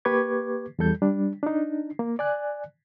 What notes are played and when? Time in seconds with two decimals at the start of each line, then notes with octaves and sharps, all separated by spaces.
0.05 A#3 G4 B4 C#6 D6 G#6
0.79 E2 G3 A4 G6
1.02 G3 D4
1.43 D4 D#4
1.99 A#3
2.19 D5 G#5 F#6